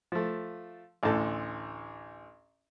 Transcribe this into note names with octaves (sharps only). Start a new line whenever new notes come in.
F3 A3
A1 D2 A2 A4 A5